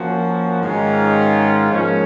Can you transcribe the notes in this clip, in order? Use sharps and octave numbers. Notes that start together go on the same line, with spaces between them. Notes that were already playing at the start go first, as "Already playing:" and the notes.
Already playing: F3 A#3 C#4 F#4
G#2 D#3 G#3 C#4 F4
G#2 F3 A#3 C#4